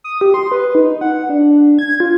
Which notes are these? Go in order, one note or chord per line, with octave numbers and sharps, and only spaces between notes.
D#6
G4
C6
B4
D#4
F#5
D4
G#6
F4